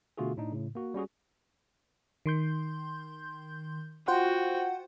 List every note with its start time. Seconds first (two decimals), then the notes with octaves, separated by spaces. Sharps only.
0.18 B2 D3 A3 F4 F#4 G#4
0.37 A2 D4 D#4
0.52 A2 C#3
0.75 A#3 F#4
0.94 G3 C#4 F#4 G#4
2.26 D#3 C6 G6
4.08 F4 F#4 C5 F#5 G5